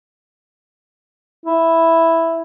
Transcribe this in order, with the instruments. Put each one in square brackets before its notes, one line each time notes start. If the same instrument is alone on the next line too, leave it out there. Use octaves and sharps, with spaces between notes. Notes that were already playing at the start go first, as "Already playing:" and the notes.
[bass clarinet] E4